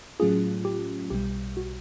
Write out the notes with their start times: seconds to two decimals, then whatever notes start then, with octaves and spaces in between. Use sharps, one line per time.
0.20 A2 F#3 A3 C#4 F4 G#4
0.65 G4
1.10 B1 B2 G3 G4
1.57 F#4